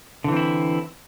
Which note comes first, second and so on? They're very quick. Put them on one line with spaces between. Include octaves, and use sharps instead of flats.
D3 E3 C4 E4